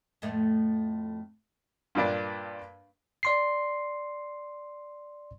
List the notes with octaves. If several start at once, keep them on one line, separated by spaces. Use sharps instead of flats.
F2 A2 A3
G2 A#2 D4
D5 C6 C7